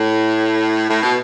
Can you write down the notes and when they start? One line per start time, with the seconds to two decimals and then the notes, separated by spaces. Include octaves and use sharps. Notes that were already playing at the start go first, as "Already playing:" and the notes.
Already playing: A2
0.90 A2
1.03 B2